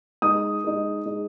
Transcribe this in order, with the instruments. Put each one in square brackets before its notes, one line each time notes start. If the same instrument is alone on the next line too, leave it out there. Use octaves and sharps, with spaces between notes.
[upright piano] G#3 D#4 G#4 [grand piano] D#6
[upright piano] G#3 D#4 G#4
G#3 D#4 G#4